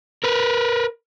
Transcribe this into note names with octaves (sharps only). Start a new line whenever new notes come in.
A#4 B4